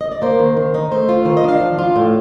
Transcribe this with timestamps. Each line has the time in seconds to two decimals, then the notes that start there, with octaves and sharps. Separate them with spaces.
0.01 D#5
0.12 D5
0.22 A#3 C5
0.39 D#3
0.57 D#3
0.74 D#4
0.91 A3 C5
1.09 F4
1.25 D#3 C5
1.37 D#5
1.44 D4 F5
1.60 F3
1.79 F4
1.96 A2